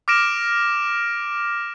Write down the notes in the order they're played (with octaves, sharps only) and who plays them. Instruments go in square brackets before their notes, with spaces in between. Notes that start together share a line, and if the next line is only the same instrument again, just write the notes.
[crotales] D6 F6 A#6 D7 E7